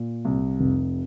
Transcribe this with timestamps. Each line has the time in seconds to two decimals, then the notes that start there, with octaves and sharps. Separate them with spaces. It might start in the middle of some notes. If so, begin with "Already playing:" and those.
Already playing: A#2
0.25 C2
0.60 F1